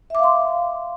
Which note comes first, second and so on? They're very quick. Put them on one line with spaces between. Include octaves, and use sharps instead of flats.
E5 D6 F5 C6